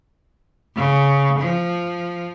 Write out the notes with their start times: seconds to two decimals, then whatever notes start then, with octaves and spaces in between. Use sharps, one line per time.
0.76 C#3
1.39 F3